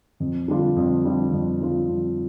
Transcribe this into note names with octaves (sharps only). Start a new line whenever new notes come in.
F2
D3 G3 D4 F4
F2
D3 G3 D4 F4
F2
D3 G3 D4 F4
F2